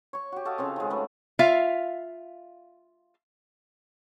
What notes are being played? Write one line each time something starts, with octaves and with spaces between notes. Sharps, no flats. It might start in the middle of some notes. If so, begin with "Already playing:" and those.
C#5 C#6
F#4 G4
F#4 A4 D#5 F5
C#3 F3 C4
D#3 G#3
F#3 A3 B4
F4 E5 F5